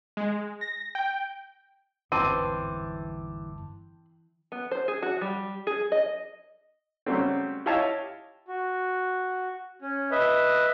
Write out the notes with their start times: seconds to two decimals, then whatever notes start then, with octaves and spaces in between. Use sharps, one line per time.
0.17 G#3
0.61 A#6
0.95 G5
2.12 G1 E2 G#2 E3 C4 A5 D6 D#7
4.52 B3
4.71 C5
4.88 G#4
5.02 F#4
5.21 G3
5.67 G#4
5.92 D#5
7.06 C#3 F#3 G3 A3 C4
7.66 E4 G4 C#5 D#5 F5 A5
8.48 F#4
9.82 C#4
10.11 B4 D#5 E5